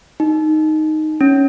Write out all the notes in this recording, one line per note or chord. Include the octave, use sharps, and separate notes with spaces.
D#4
C#4